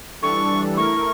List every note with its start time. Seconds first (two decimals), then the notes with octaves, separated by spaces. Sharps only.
0.22 E3 G3 D4 A4 C#6
0.76 A3 E4 A#4 C#6